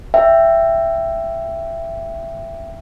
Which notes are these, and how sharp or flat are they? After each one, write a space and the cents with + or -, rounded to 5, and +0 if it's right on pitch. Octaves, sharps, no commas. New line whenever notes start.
E5 +15 G5 +0